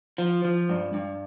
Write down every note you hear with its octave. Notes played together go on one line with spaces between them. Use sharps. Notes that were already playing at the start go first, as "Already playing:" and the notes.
F3
F3
G2
G2